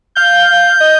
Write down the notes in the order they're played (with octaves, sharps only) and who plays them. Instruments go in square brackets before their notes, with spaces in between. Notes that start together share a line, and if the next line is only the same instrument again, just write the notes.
[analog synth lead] F5 [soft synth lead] G6
[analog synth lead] D#5